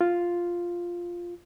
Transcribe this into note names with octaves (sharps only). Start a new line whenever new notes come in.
F4